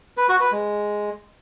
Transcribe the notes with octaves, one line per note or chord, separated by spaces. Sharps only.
B4
F#4
B4
G#3